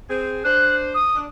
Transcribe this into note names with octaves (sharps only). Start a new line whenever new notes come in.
C4 G#4
D4 C5 F#6
D#6
D4